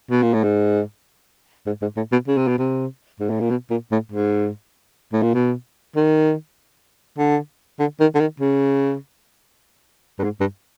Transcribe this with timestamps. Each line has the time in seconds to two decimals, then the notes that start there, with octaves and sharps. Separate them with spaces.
0.10 B2
0.22 A#2
0.34 A2
0.44 G#2
1.67 G#2
1.82 G#2
1.97 A2
2.12 B2
2.28 C#3
2.37 C3
2.48 B2
2.58 C3
3.20 G#2
3.30 A2
3.40 A#2
3.50 B2
3.70 A#2
3.92 A2
4.12 G#2
5.13 A2
5.23 A#2
5.34 B2
5.96 D#3
7.18 D3
7.79 D3
8.00 D#3
8.15 D3
8.20 D#3
8.40 C#3
10.19 G2
10.24 G#2
10.40 G2